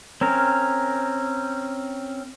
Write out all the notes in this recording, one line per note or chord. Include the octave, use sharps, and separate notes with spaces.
C4 C#4 A#4